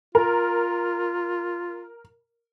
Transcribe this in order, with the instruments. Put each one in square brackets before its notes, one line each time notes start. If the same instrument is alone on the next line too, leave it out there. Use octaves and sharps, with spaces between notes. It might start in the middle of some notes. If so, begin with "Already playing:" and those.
[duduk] F4 [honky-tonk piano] A#4